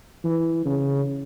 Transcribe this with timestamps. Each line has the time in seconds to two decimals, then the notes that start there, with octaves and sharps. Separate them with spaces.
0.25 E3
0.65 C#3